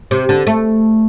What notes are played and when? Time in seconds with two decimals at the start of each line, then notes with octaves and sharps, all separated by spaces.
0.11 C3
0.29 D3
0.47 A3